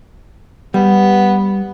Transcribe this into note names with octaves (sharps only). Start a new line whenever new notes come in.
G3 B3